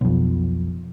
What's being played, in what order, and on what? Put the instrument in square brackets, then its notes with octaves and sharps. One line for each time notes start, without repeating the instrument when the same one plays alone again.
[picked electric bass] B1 F2